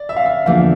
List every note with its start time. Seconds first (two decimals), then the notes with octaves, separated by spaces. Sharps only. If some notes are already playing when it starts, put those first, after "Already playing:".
Already playing: D5
0.09 E5
0.17 F5
0.26 E5
0.46 E2 D3 F3 A#3 F4 F5